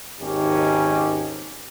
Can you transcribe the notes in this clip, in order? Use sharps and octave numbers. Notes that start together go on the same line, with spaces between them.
G#1 D#2 C#4 D#4 G4